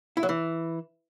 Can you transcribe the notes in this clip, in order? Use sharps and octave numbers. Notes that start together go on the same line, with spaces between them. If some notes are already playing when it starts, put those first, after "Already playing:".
E4
F#3
E3